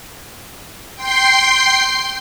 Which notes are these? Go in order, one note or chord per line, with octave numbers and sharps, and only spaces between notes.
G5 C6 C7